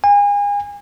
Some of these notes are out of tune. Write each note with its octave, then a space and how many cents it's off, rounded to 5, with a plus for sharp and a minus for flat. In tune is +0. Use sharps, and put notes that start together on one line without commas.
G#5 -35